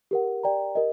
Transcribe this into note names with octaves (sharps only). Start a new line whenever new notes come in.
G4 A#4 F#5
G4 A#4 D5 G5 A#5
G4 A#4 D#5